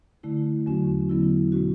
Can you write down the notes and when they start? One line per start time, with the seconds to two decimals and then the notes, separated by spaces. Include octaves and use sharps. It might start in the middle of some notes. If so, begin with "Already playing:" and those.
0.23 D3 A3 E4
0.66 E2 D3 F#3 C#4 F#4
1.09 D3 F#3 B3 E4
1.52 B2 G#3 C#4 F#4